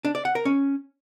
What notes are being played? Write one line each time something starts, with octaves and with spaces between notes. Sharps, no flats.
D4
D5
F#5
A#4
C#4